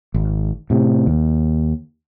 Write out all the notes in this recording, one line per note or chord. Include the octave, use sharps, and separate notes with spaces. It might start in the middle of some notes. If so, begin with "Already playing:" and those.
G#1
A2 C3
D#2